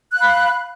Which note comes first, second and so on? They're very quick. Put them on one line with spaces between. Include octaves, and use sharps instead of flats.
F#6 F5 B5